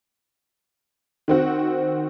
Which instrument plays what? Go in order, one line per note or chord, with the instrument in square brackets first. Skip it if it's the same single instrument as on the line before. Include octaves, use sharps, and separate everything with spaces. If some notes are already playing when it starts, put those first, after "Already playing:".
[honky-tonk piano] D#3 C4 F#4